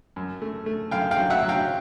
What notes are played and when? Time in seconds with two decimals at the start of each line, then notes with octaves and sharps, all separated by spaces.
0.16 F#2
0.42 A3
0.66 A3
0.91 F#2 F5 G5
1.11 F5 G5
1.17 F#3
1.30 E5 F#5
1.43 F#3
1.49 F5 G5